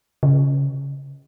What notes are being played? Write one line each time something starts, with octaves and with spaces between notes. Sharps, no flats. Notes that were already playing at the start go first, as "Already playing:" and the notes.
C#3